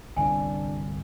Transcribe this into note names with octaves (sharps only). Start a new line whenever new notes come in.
G1 C2 D4 G#5